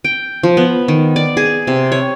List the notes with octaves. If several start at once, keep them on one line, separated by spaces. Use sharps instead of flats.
G5
F3
B3
D#3
D5
G#4
C3
C#5